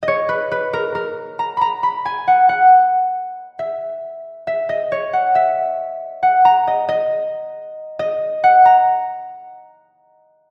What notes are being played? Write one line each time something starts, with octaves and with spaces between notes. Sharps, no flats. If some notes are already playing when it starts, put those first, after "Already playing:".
D#5
C#5
B4
B4
A#4
A#4
A#5
A#5 B5
B5
G#5
F#5
F#5
E5
E5
D#5
C#5
F#5
E5
F#5
A#5
D#5
D#5
D#5
F#5
A#5